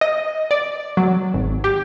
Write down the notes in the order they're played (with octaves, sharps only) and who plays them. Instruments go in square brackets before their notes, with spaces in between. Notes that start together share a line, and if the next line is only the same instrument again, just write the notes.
[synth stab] D#5
D5
F#3
G#1
G4